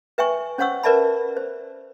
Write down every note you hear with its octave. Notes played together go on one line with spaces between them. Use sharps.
B4 E5 G5 G#5 C#6
C#4 C5 C#5 F#5 C#6 E6
A#4 B4 D5 E5 A5 B5
C5